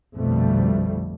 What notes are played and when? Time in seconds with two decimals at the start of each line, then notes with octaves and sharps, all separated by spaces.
0.14 A#1 F2 B2 D3 G3 A3